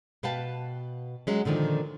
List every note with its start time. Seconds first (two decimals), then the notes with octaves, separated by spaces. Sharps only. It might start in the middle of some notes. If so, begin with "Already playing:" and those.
0.23 B2 B4 F5 G5 A5
1.27 F#3 G#3 C#4
1.45 A#2 D3 D#3 F3